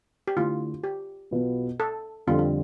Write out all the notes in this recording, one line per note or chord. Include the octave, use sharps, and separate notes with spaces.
G4
D3 A3 E4 F4
G4
B1 B2 B3 F4 B4
A4
F2 D3 G3 D4 F4
F4